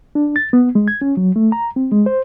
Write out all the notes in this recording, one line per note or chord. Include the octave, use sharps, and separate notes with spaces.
D4
A6
B3
G#3
G#6
C#4
F#3
A3
A#5
C4
G#3
C5